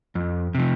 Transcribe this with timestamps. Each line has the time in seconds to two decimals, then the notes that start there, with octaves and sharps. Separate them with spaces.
0.15 F2
0.55 C3 F3